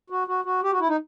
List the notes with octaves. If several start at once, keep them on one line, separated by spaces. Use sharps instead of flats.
F#4
F#4
F#4
G4
F#4
E4
D#4